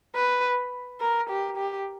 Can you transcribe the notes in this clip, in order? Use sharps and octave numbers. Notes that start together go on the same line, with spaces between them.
B4
A#4
G4
G4